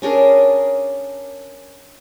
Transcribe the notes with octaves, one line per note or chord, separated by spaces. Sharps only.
C#4 D4 G#4 A#4